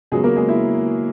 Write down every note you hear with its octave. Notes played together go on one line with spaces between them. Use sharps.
C#3 F#3 G#3 B3 G#4
A#3 A#4
G#3 G#4
E4